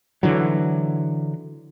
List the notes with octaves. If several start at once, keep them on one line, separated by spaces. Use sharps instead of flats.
D3 E3 F#3